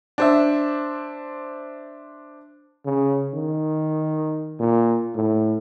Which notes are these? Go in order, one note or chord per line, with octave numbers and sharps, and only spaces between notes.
D4 C5 E5
C#3
D#3
A#2
A2